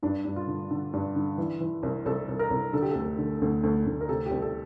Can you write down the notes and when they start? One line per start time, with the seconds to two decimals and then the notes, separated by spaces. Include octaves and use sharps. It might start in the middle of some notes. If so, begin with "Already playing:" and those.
0.02 G2 D4
0.25 G2
0.36 F4
0.48 D3
0.71 D3
0.93 G2
1.16 D3
1.38 E3
1.60 E3
1.83 C2
2.05 C2 A4
2.28 C2
2.39 A#4
2.50 C2
2.73 D3 A4
2.82 G4
2.91 D2 A4
3.18 D3
3.42 D2
3.63 D2
3.86 D2
4.01 A#4
4.09 C3 A4
4.26 G4
4.31 C2
4.42 A4